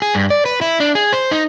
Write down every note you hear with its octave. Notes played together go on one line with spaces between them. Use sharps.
G#4
G2
D5
B4
E4
D4
G#4
C5
D#4